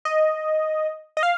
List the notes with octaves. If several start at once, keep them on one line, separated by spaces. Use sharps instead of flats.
D#5
D#5
F5